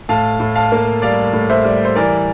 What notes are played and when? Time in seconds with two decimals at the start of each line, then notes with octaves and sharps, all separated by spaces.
0.09 A2 F5 A5
0.40 A2
0.55 F5 A5
0.72 A#3
1.02 G3 D5 F5
1.33 A2
1.50 C5 E5
1.64 G3
1.85 C5
1.95 E3 A#4 D5